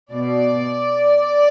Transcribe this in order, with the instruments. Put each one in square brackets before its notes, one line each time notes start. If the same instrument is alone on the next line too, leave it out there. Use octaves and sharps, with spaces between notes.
[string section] B2 D5